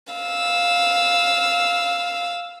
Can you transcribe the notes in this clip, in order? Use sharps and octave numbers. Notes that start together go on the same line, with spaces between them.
F5 E6